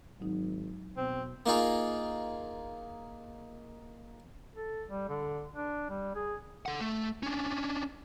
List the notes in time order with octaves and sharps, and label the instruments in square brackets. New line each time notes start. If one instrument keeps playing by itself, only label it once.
[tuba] G#1 [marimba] F#3 D#4
[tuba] B2 [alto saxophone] C4
[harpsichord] A#3 D#4 F4 G#4
[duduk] A4
G3
D3
D4
G3
G#4
[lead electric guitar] A4 F#5
A3
C#4 D4